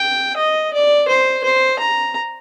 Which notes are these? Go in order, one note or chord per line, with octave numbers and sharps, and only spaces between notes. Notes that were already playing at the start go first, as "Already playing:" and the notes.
Already playing: G5
D#5
D5
C5
C5
A#5